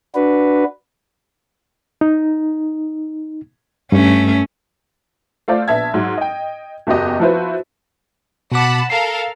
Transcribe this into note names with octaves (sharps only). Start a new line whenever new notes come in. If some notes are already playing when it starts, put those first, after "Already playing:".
D4 F#4 B4
D#4
G2 A3 C#4
A3 F4 C5 D5
A#1 B3 E5 A5 G#6
G#2 F#3
D#5 G5
F#1 E2 F#4 G4 D#5
F3 B3 E4 F#4 B4 C5
B2 F#5 A5 B5 D6
A4 A#4 F5 C7